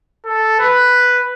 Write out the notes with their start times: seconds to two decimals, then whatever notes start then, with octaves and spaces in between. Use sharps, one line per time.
0.25 A4
0.59 B4